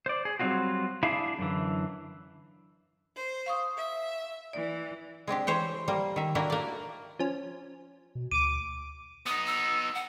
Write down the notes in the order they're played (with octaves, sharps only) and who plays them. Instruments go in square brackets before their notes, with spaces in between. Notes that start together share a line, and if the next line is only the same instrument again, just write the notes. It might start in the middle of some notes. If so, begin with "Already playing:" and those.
[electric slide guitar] C5 D5
G#4
F#3 G3 C4 D#4 F4 F#4
D4 E4 G#4 E5 F5
F#2 D3 E3
[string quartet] C5
[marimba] F5 C#6 D#6
[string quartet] E5
[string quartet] E3 [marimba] D5
[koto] G#3 C4 D4 G4
E3 C5 C#5 G5
G3 A#3
D#3 E5
A#3 D4 E4 F#4 G4
A#3 D5
[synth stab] F3 C#4
[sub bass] B2
[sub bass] D2 [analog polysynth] D6 [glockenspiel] D#7
[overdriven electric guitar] B3 D#4 [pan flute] D#6
[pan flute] E6
F#5